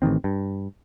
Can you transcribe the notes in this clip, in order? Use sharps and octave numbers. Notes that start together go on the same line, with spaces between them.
A1 D3 D#3 C4
G2